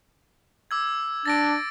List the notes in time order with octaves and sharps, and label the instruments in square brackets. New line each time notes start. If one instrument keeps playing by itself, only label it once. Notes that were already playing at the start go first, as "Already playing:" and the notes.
[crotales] D6 E6 G#6
[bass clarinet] D4 [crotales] A6 A#6 D7